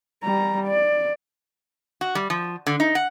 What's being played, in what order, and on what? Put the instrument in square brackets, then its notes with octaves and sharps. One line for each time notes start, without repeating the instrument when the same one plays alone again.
[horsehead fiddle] G3 A#5
D5
[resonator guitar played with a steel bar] F#4
G3
F3
D3
D#4
F#5